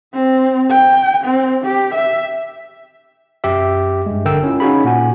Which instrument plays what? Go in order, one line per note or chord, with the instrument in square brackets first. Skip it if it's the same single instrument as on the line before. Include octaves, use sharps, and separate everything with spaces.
[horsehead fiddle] C4
G5
C4
G4
E5
[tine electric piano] F#2 G4 E5
G2 G#3
A#1 D3 A#4 G5 E6
C#4 E4 F4
C#4 D#4 F#4 G#4 F5 B5
A#2 F#4 F#5 G#5